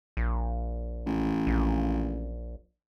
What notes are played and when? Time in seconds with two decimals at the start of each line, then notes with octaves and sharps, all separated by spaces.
0.17 A#1
1.06 A1
1.47 A#1